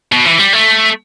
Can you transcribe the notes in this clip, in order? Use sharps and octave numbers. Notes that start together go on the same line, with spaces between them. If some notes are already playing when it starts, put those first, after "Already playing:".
B2
E3
G3
A3